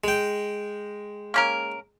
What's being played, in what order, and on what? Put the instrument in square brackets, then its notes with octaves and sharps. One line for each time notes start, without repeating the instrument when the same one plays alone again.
[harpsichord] G#3 G5
[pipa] A#3 C#4 A#4